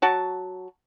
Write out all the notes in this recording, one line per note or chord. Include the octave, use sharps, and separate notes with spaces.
F#3 F#4 A5